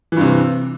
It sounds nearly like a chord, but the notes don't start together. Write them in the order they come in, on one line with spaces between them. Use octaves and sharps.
E3 G2 C3